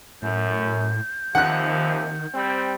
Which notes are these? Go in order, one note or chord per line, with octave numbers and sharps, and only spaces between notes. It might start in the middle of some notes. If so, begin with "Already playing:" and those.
F#2 A2 G6
D#2 C3 D#3 F3 F#5 F#6
G3 C4